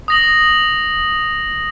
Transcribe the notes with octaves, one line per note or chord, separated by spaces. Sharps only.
D#6 A#6 F#7